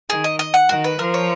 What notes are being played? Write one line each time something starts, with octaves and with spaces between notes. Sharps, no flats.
D#3 G#4
D#5
D#5
F#5
D#3 F#4
B4
F3 A#4
C#5